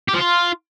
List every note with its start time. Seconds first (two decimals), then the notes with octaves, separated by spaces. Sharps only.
0.08 G4
0.14 F3
0.19 F4